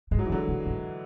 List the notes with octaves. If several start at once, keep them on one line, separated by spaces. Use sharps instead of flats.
G#2 G#3
F#3
E3
A2
D3 F#3
B2
G#2